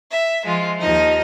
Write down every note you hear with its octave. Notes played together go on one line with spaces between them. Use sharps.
E5
F3 G#3 F4
D#2 F3 D#4 D#5